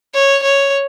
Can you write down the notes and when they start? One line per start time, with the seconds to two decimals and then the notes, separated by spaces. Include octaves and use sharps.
0.14 C#5
0.43 C#5